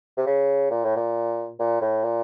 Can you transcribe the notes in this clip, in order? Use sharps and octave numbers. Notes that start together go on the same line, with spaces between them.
C3
C#3
A#2
A2
A#2
A#2
A2
A#2